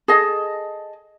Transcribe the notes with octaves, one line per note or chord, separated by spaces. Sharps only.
G#4 A4 D#5